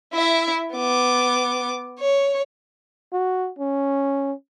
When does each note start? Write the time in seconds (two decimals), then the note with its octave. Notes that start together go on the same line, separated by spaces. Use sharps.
0.14 E4 E5
0.74 B3 D6
2.00 C#5
3.13 F#4
3.59 C#4